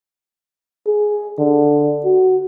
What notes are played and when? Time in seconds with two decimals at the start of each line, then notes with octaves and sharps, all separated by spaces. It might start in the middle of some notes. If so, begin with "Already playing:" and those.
0.87 G#4
1.38 D3
2.05 F#4